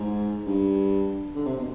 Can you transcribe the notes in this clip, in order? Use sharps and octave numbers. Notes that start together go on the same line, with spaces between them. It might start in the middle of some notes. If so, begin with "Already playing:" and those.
Already playing: G#2
G2
D3
C3
B2